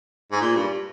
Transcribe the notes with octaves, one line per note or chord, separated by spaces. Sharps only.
G#2
A#2
G2